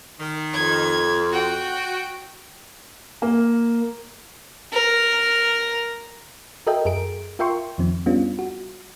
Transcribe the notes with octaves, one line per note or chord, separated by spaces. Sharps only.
D#3
F2 G#6
F#4 G5
A#3
A#4
F#4 A4 A#4 D#5 E5 G5
F#2 G#4 A#4 D7
F4 A#4 E5 G5 C6 C#6
F2 D#3 F3 C4
G3 B3 C#4 D4 F4
F#4